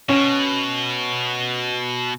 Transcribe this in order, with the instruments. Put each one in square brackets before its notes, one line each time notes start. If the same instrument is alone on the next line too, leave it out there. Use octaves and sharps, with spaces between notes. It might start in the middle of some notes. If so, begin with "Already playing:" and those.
[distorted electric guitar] B2 [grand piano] C#4